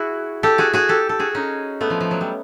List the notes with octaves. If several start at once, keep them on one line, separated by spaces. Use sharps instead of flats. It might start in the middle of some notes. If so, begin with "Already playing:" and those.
Already playing: E4 F#4 G#4
G4 A4
F#4 G#4
F#4 G#4
G4 A4
A4
F#4 G#4
C#4 D#4
A3 B3
F3
F3
F#3
G3